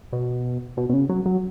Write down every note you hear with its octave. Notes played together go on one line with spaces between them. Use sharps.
B2
B2
B2
C#3
F#3
F#3